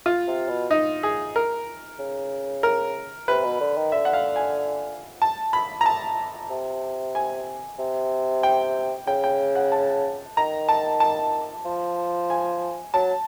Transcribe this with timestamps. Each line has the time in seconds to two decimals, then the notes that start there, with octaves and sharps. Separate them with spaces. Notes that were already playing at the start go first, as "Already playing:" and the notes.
0.06 F4
0.27 C3
0.49 B2
0.71 D#4
1.03 G#4
1.36 A#4
1.99 C#3
2.63 A#4
3.28 C3 B4
3.44 B2
3.60 D3
3.77 D#3
3.92 D3 E5
4.05 F#5
4.14 F5
4.36 G#5
5.22 A5
5.53 B5
5.81 A#5
5.86 A5
6.50 C3
7.15 G#5
7.79 C3
8.43 G5
9.07 C#3 G5
9.24 G5
9.55 F#5
9.72 A5
10.37 D#3 A#5
10.69 A5
11.00 A5
11.65 F3
12.30 G#5
12.94 F#3 A5